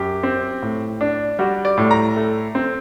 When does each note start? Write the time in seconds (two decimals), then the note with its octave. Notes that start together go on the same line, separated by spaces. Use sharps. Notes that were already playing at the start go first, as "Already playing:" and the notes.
Already playing: F#2 G4
0.23 C4
0.62 A2
1.01 D4
1.39 G3 F#4
1.65 D5
1.77 A2
1.91 A#5
2.16 A3
2.55 C4